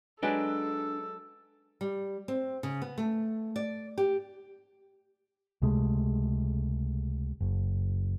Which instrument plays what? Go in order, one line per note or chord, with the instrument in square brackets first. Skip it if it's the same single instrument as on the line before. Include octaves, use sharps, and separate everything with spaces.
[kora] F#3 G#3 B4 [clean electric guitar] D4 G5 A5 [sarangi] A4
[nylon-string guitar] G3
C4
C#3
B3
A3
D5
G4
[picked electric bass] C#2 C3 G#3 A3
F#1